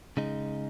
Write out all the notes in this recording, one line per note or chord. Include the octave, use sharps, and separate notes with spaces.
C#3 G#3 D#4